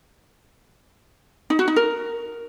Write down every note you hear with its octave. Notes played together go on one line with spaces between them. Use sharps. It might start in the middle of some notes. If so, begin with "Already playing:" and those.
D#4
F#4
D#4
A#4